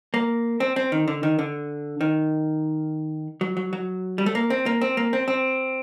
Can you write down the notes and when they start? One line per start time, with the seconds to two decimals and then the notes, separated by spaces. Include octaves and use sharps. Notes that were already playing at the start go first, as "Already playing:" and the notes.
0.14 A#3
0.60 C4
0.76 C4
0.92 D#3
1.08 D3
1.23 D#3
1.39 D3
2.01 D#3
3.41 F#3
3.57 F#3
3.73 F#3
4.18 G3
4.26 A3
4.35 A#3
4.50 C4
4.66 A#3
4.81 C4
4.97 A#3
5.13 C4
5.28 C4